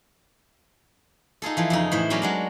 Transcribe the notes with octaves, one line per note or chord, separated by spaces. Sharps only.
D#4 F4 G#4 A4
E3 F3 A4
F2 C#3 D#4
A2 E3 C5
F#3 B3 C#4 A#4 D5
F#3 G#3 D4